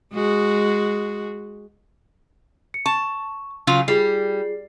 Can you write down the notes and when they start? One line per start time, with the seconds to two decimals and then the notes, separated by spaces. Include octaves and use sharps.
0.13 G#3 F#4 G#4
2.74 C#7
2.86 A5 C#6
3.67 C#3 F#3 F4
3.88 G3 F4 G#4 C7